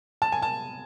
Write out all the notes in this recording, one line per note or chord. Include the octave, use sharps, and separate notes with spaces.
A5
G#5
A5